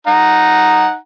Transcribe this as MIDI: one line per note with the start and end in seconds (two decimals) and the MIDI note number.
0.07 0.95 63
0.07 0.95 78
0.07 0.95 82